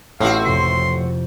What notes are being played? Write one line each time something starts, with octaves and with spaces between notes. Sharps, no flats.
A1 A2 B3 C4 E4 F#4 F5
F2 C3 C6